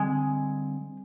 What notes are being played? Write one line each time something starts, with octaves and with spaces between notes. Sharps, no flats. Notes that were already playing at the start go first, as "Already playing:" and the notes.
Already playing: D3 G3 G#3 C4